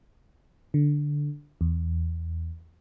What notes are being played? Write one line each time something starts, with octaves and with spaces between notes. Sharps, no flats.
D3
E2